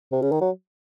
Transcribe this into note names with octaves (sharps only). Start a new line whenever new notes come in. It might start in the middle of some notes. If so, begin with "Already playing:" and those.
C3
C#3
D#3
F#3